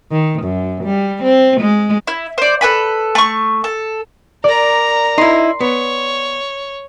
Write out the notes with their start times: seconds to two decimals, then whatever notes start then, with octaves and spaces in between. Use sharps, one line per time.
0.11 D#3
0.43 F#2
0.84 G3
1.23 C4
1.61 G#3
2.07 E4
2.38 C5 D5
2.61 A4 B4 G#5 B5
3.15 A3 C#6
3.64 A4
4.44 A#4 D5 A#5
5.18 D#4 E4 C6
5.61 B3 C#5